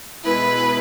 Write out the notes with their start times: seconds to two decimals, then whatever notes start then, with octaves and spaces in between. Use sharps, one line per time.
0.23 B2 G#3 B3 E4 B4